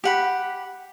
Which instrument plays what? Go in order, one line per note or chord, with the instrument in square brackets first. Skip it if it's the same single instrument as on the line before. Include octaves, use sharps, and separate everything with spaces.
[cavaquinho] G4 F#5 B5